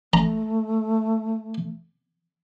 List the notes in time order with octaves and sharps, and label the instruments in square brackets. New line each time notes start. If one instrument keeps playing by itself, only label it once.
[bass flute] A3 [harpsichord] A#5